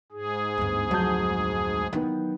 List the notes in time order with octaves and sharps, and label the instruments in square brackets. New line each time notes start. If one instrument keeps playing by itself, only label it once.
[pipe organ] G#2 G#4
[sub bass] D2 [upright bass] G2 B3
[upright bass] F2 [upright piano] F#3 A5 G6
[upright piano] D#3 B3 [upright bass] E3 F#3